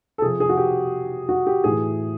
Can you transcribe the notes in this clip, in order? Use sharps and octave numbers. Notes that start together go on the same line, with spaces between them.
A4
C3 F3 G#4
G#4
F#4
G4
F#4
G4
A2 E3 G#4